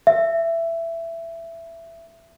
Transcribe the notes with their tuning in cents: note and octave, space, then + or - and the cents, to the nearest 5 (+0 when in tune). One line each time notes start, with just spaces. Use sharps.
E5 +15